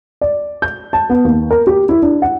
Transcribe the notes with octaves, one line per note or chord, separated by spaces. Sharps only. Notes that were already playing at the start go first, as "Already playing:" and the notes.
D5
G6
A5
B3
D#2
A#4
G4
E4
D4
F#5